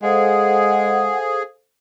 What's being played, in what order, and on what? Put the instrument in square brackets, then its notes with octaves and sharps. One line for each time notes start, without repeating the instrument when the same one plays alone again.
[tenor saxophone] G#3 [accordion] G#4 [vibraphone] A4 C5 F5 [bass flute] F#5